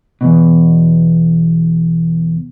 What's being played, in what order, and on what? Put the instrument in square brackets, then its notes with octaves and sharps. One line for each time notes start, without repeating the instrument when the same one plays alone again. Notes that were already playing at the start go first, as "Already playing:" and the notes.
[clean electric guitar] E2 G2 B2